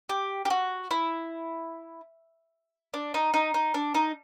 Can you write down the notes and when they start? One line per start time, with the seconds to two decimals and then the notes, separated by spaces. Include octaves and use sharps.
0.09 G4
0.45 G4
0.50 F#4
0.91 E4
2.94 D4
3.14 D#4
3.34 D#4
3.54 D#4
3.74 D4
3.94 D#4